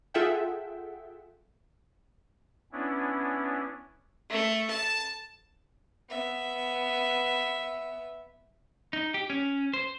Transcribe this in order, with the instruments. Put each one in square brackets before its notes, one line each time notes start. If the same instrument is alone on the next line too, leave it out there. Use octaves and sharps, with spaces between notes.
[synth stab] F4 G#4 A4 E5 F#5 G5
[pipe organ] B3 C#4 D4 E4
[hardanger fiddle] A3
A5
B3 E5
[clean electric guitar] D#4
G4
C#4
C5